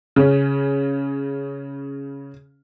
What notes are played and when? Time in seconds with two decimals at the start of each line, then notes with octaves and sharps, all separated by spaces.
0.16 C#3 C#4